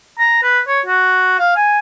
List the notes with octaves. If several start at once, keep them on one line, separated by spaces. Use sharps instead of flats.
A#5
B4
C#5
F#4
F5
G#5